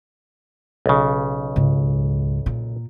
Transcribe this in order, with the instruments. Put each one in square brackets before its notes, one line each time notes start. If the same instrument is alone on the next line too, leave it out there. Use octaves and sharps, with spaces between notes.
[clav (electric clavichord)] B1 C#3
[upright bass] C#2 G#2
A#2